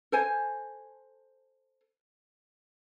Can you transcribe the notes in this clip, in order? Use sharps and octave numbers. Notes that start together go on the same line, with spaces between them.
A4 C5 G#5